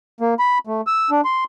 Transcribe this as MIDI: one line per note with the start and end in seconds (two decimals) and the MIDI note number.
0.21 0.34 58
0.39 0.58 83
0.67 0.81 57
0.87 1.10 88
1.10 1.21 62
1.25 1.44 84